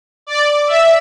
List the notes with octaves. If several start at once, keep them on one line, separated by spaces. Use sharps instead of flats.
D5
E5